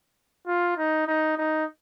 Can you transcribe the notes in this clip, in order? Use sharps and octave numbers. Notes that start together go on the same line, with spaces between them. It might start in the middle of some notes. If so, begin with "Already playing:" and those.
F4
D#4
D#4
D#4